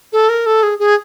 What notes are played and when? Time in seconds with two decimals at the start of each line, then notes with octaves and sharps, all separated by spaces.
0.13 A4
0.29 A#4
0.46 A4
0.63 G#4
0.79 G#4